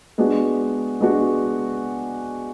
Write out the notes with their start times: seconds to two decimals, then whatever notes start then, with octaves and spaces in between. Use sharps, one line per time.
0.18 G#3 B3 D4 F#4
1.01 G#3 B3 D4 F#4